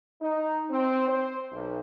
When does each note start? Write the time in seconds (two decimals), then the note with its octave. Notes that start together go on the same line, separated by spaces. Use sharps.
0.21 D#4
0.70 C4
1.08 C5
1.52 B1